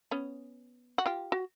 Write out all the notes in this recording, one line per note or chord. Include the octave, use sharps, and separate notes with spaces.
B3 C#4
F#4
F4 G4
F#4